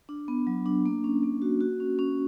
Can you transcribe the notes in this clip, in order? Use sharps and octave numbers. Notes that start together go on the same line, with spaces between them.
D4
B3
F#3
D4
A#3
C#4
A#3
F#4
F#4
C#4
C#4